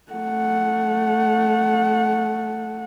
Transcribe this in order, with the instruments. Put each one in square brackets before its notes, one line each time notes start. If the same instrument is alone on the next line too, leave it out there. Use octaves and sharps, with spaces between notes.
[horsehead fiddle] A3 F#5